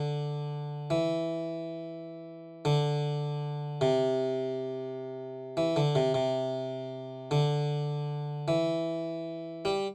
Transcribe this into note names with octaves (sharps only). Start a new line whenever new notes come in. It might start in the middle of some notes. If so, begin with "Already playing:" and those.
Already playing: D3
E3
D3
C3
E3
D3
C3
C3
D3
E3
G3